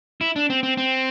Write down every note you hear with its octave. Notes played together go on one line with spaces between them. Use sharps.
E4
D4
C4
C4
C4